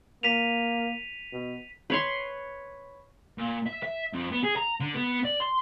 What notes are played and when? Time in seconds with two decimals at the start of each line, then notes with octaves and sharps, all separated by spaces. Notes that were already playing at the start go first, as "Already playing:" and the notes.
0.23 A#3 B6 D#7 F7
1.33 B2
1.90 B4 C#5 C6
3.38 A#2
3.67 E5
3.83 E5
4.13 F2
4.32 B3
4.43 G#4
4.56 A#5
4.80 D3
4.94 B3
5.24 D5
5.40 C6